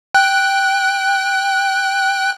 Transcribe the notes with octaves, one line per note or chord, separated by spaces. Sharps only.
G5 F#6